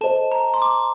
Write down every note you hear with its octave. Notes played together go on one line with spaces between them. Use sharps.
A4 C5 D#5 A5
A#5
C6
D6